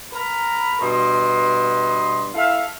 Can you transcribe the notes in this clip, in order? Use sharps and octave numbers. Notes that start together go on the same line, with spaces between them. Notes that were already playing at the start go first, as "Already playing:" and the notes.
A#4 A#5 B5
G2 B2 B3 D#5 C6
E4 A4 E5 F5